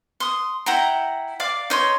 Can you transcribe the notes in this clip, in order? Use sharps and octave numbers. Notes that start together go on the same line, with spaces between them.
C6 D#6
E4 F#5 G5 A#5
D5 F5 D6
D#4 C#5 C6